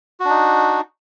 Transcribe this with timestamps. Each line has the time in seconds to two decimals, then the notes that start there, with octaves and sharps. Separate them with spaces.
0.20 F#4
0.25 D4
0.30 D#4